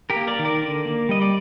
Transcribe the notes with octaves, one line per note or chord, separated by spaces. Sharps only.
G4 A#4
A#3
A#4 D5
D#3
A#4 D5
D3
A#3
G3 D#5
D5